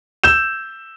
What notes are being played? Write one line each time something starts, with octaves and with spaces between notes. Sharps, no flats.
E6 G6 E7